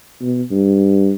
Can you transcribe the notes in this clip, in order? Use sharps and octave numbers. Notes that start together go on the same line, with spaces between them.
B2
G2